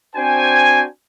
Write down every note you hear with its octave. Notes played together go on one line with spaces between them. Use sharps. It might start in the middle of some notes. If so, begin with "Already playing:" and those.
C4 D4 F#4 C5 G5 G#5